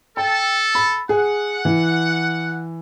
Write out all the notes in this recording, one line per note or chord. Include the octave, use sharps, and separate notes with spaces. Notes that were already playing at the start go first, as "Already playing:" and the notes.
A4 G5
B5
G#4 F#5
E3